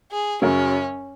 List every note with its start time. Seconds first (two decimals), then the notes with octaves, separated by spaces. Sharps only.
0.12 G#4
0.42 F#2 C#3 F#3 C#4